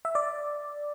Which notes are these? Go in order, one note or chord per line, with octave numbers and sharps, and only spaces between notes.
E5
D5